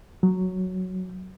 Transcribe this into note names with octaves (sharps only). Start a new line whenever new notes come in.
F#3